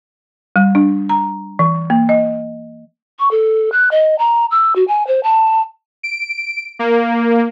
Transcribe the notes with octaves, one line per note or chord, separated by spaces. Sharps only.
G3
D4
A#5
E3
A#3
D#5
C#6
A4
F#6
D#5
A#5
E6
F#4
G#5
C5
A5
D7
A#3